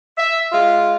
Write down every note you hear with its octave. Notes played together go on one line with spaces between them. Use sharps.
E5
G#3 F4